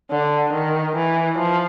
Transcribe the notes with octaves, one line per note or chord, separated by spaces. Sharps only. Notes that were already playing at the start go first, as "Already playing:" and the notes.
D3
D#3
E3
F3